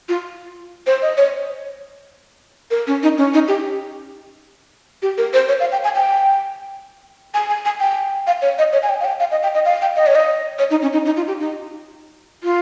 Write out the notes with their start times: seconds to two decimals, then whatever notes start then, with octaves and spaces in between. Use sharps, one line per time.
0.09 F4
0.87 C5
1.02 D#5
1.17 C#5
2.71 A#4
2.87 C#4
3.03 D#4
3.18 C#4
3.34 D#4
3.48 G4
5.02 G4
5.18 A#4
5.33 C5
5.49 C#5
5.60 F5
5.72 G5
5.84 G#5
5.95 G5
7.34 G#5
7.50 G#5
7.65 G#5
7.80 G5
8.27 F5
8.42 C#5
8.58 D#5
8.73 C#5
8.83 G#5
8.89 G5
9.00 F5
9.05 G5
9.20 F5
9.31 D#5
9.43 G5
9.54 D#5
9.65 F5
9.82 G5
9.96 D#5
10.07 C#5
10.15 D#5
10.59 C#5
10.71 D#4
10.82 C#4
10.93 D#4
11.05 D#4
11.16 F4
11.28 G4
11.40 D#4
12.43 F4